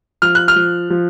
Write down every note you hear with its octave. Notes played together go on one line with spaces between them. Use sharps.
F3 F6
F#6
F6
F3
F3